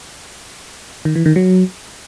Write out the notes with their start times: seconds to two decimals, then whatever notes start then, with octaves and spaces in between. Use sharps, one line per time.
1.05 D#3
1.15 E3
1.26 D#3
1.36 F#3